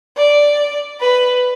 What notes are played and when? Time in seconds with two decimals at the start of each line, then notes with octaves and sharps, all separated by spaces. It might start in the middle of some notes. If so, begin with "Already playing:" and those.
0.17 D5
1.00 B4